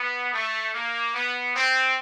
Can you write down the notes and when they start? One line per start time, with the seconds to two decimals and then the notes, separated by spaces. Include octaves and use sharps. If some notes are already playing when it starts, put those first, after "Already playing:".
Already playing: B3
0.33 A3
0.75 A#3
1.15 B3
1.55 C4